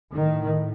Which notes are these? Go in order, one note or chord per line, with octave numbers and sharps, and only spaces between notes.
A2 D#3